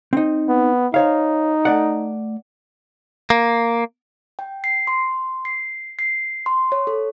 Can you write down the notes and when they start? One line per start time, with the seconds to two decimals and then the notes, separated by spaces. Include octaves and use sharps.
0.13 C4 D#4
0.48 B3
0.94 D#4 C5 C#5 F5
1.65 A3 D5 F#5
3.30 A#3
4.39 G5
4.64 C7
4.87 C6
5.45 C7
5.99 C7
6.46 C6
6.72 C#5
6.87 A4